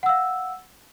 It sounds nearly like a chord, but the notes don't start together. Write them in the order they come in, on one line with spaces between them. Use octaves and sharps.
F#5 E6 F5